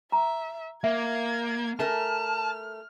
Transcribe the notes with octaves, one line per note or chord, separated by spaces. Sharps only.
E5 A#5
A#3 E5 G#6
A3 A#4 G#5 A5 F6